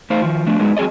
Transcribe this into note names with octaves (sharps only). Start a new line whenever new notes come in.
A3 D#4 C5 F5
D#3 F3
F3 A3 D4
F#3 G#3 B3 D#4
F#3 C4 G#4 D5 D#5